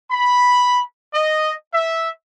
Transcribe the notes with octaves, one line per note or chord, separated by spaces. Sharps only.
B5
D#5
E5